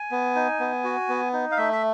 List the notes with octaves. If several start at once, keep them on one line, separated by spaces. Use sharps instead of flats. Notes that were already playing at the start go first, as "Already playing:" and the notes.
Already playing: G#5
B3
D#4
B3
F#4
B3
D#4
F5
A3 E5
E5